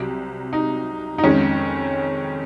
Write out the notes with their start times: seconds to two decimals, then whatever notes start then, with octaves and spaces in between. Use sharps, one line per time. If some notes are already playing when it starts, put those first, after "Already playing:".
Already playing: C2 C3 F#3
0.53 D#4
1.18 D#4
1.24 F2 D#3 G#3 C#4